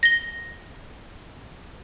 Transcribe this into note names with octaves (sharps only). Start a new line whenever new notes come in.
A#6 G7